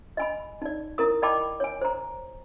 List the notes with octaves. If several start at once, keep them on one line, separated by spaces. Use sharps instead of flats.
D#5 G#5 B5
D#4 D5
E4 A#4 D#6
D5 D#5 G5 A5 B5 D6
C#5 G#5
C5 A#5